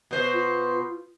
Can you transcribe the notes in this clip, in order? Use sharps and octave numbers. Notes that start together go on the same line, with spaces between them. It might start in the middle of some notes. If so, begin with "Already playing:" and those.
B2 C5
F4